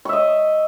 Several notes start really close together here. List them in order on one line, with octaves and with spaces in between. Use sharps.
C#6 E5 D#5